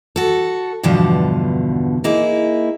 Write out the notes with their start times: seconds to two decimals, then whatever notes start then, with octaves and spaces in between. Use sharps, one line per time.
0.16 F#4 A4
0.83 E2 G2 B2 D3 F3
2.04 A#3 D#4 E4 G#4